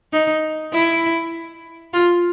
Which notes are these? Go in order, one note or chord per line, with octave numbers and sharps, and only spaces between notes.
D#4
E4
F4